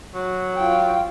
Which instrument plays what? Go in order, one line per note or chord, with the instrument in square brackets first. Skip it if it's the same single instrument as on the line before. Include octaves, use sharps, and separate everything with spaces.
[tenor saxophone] F#3
[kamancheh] F4 G5